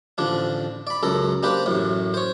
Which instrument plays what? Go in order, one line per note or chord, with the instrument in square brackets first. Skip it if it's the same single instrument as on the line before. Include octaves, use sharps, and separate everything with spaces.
[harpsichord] A1 D3 F3 D4
D5 B5
C#2 F#2 A4 A#4
A#3 D4 G4 B4 C5
A1 F#2 A2
C5 C#5